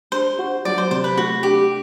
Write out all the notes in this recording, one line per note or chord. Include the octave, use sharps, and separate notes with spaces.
D4 C5
F#4
F#3 D5
C5
C3 C5
B4
A3 F#4
D4 G4